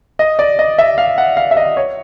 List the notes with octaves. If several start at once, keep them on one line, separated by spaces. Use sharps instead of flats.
D#5
D5
D#5
E5
F5
F#5
F5
E5
D#5
C#5